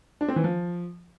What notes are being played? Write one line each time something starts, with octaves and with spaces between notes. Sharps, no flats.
D4
C4
E3
F3